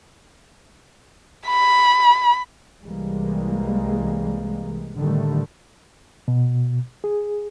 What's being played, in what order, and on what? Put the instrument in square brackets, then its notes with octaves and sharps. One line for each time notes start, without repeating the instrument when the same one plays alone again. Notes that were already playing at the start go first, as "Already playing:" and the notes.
[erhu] B5
[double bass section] C2 E3 G3 G#3 A#3
A2 D3 D#3 G3 A3
[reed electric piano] B2
G#4